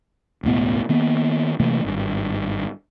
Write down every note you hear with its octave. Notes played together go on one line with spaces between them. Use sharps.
E1 C#2 A2 B3
D#3 A#3 B3
C3 E3 A3 A#3
G#1 G2